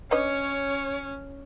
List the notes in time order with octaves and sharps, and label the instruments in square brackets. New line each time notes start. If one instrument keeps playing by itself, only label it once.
[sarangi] C#4 [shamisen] D4 B4 D#5 [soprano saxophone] C#5